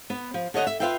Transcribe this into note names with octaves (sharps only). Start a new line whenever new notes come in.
B3
F3
D3 C#5 D#5 F#5
E5
F4 F#4 B4 E5 F5 G5